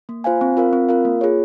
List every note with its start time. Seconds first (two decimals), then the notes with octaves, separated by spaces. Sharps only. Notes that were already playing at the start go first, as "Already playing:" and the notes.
0.09 A#3
0.24 F4 C5 F5 G#5
0.41 C4
0.57 F4 A#4 F5
0.73 C4
0.89 F4 A#4 F5
1.05 A#3
1.21 F4 G#4 C#5